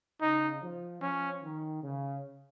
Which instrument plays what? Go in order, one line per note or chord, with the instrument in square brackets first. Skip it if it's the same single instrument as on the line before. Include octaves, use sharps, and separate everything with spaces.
[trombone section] C#3 [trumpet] D#4
[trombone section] F3
[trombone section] F3 [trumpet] C#4
[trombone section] D#3
C#3